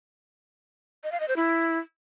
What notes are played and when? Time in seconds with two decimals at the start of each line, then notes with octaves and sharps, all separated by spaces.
1.04 D#5
1.12 F5
1.20 D#5
1.28 C5
1.36 E4